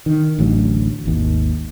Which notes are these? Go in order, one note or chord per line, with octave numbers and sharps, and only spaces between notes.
D#3
A1 D2 F#3
G#1 D#2